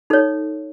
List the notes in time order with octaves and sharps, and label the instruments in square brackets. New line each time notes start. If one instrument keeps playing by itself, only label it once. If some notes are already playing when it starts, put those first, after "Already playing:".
[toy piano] D#4 A4 C#5